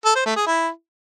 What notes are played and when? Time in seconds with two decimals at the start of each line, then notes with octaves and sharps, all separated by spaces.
0.05 A4
0.15 C5
0.26 A3
0.36 G#4
0.47 E4